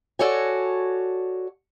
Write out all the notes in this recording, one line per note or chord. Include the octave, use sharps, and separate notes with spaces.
F#4 A4 C#5 D5 G#5